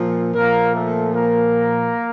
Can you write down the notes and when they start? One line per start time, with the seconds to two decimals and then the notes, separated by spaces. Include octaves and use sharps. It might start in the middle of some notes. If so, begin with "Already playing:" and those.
Already playing: A#2 F3
0.34 A#2 F3 A#3 A#4
0.74 A3 A4
1.14 A#3 A#4